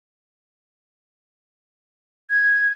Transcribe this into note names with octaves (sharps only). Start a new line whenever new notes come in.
G#6